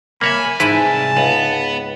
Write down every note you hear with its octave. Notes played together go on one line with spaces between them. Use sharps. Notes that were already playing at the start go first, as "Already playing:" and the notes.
C2 A#3 C#5 E5 G#5 B5
G#2 E4 B4 E5 A5 B5
C#2 B3